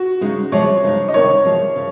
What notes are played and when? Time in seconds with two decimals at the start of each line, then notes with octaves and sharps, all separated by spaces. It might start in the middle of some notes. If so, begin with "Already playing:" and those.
Already playing: F#4
0.21 C#3 G#3 D#4
0.52 C3 F3 G#3 C#5
0.83 C#3 G#3 C4 D#4
1.08 D#5
1.14 C3 D#3 A#3 D#4 C#5
1.45 C3 F3 G#3
1.76 C#3